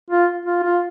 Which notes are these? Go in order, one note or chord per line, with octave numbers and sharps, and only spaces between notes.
F4
F4
F4